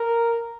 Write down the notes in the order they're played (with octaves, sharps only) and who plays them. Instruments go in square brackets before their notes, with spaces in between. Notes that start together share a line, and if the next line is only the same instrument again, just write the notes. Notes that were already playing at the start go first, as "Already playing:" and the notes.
Already playing: [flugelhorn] A#4